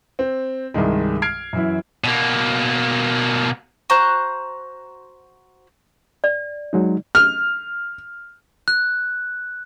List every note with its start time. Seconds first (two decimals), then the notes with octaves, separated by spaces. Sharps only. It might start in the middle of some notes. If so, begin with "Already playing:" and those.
0.19 C4
0.74 C2 G2 D#3 G#3
1.22 F6 G#6 C7 D7
1.53 F#2 E3 E4
2.04 B2 A#3
3.90 F#4 C5 A#5 F#6
6.24 D5
6.73 F#3 G#3 D#4
7.15 F6
8.68 F#6